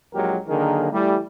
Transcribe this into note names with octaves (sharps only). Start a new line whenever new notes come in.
A#1 A#2 F#3 G#3 G4 A#4
D3 D#3 F#3 A#3 G#4 A#4
E3 G3 A3